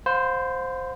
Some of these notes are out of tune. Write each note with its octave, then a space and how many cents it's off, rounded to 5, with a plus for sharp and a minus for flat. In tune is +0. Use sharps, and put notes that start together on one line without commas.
C5 +0 F5 +40 B5 +40